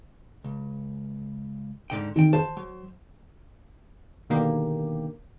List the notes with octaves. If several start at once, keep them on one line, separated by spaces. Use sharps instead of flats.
C#2
G#2 D3 G5
D#3 C4 G5
C5 A5
F#3
B2 D3 D#3 A#3 G4